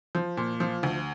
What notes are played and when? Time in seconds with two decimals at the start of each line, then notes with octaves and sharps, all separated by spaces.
0.15 F3
0.37 A#2
0.60 F3
0.83 D2